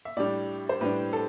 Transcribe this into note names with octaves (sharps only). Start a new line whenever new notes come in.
E5
A2 G3 D4 D5
C5
A2 G3 D4 B4
A4